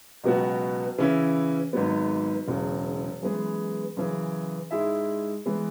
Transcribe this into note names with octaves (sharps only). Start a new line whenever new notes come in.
C#2 B2 F#3 B3 F#4
C#3 E3 C#4 E4
G#1 G#2 F#3 B3
E1 E2 C#3 F#3
F#2 E3 G#3 B3 G#4
F#2 C#3 E3 C#4 G#4
G#2 G#3 E4 G#4 E5
E3 G#3 B3